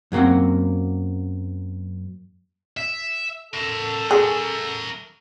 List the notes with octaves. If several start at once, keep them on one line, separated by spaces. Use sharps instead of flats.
F#2 F#3 A#3 C4 F#5
E5
A4 A#4 E5
G#4